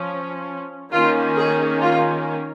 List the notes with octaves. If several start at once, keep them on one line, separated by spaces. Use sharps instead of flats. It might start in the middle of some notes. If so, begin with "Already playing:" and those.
Already playing: F3 C#4
D#3 A#3 C#4 F4
G#4
F4